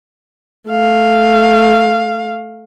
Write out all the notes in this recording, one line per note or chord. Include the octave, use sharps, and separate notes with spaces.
A3 F5